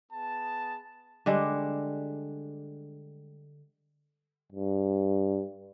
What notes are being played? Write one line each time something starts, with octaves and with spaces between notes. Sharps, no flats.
B3 G#4 A5
D3 G3 G#3 D4
G2